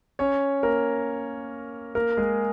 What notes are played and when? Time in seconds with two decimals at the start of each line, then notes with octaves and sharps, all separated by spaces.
0.19 C#4 C#5
0.63 A#3 A#4
1.95 A#3 A#4
2.17 G#3 G#4